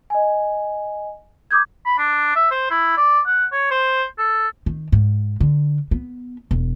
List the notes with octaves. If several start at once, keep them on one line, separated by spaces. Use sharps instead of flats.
D#5 G#5
D6 D#6 G6 G#6
B5
D4
E5
C5
E4
D5
F#5
C#5
C5
A4
D#3
G#2
D3
B3
E1